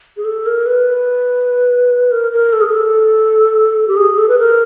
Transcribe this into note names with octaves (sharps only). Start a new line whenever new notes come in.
G#4
A4
A#4
B4
A#4
A#4
A4
G#4
A4
G4
G#4
A4
B4
A#4